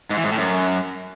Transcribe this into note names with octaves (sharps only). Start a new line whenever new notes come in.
G#2
E3
G#2
A2
F#2